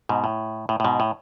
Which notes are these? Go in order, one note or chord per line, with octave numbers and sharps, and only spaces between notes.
G#2 B2
A2
A2
A2
G#2 B2
A2